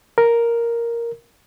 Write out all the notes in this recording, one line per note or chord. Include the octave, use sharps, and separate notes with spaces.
A#4